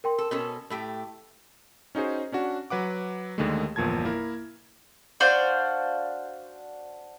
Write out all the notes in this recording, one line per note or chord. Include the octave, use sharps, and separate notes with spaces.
A#4 G5 C6
A4
B2 C#4 A4
A2 A3 G4 A4
C#4 D#4 F#4 G#4 C5
C#4 D4 F#4 F#5
F#3 B4 F#5 D6
D#2 D3 D#3 G#3 A3
G1 E2 A#2 F3 A5 G#6
A#3 E4 A#4
D4 F#4 C5 F5